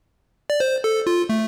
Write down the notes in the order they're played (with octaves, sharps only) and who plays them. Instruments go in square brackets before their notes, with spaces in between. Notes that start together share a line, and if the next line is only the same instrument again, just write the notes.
[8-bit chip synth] D5
C5
A4
F4
A3